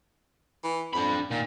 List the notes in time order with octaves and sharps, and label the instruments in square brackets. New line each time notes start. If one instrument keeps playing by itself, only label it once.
[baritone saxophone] E3
[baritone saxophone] F2 [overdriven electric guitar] D4 B5
[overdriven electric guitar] A#2 [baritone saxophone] D#3